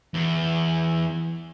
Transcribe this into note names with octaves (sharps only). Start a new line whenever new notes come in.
E2